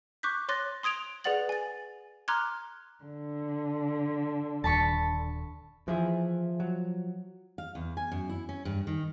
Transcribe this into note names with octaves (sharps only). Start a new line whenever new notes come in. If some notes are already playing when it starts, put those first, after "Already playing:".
C#6 D6 F#6 G6 B6
C#5 C6 D6 F#6 A6 A#6
C6 D#6 G#6 D7 F7
G#4 B4 D5 F#5 A6 F#7
G#5 A6
A#5 C6 D6 F6 F#6 G#6
D3
D#1 A5 B5 C#6
E3 F3 E4 G#4
F#3
F5
E2
G#5
F#2
E4
C#4
G2
D#3